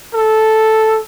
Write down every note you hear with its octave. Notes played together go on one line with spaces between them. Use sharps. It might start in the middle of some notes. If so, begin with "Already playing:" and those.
A4